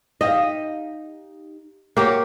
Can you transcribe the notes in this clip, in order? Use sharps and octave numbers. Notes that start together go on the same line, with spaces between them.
D#4 G4 D#5 F5
A#3 F#4 G4 C#5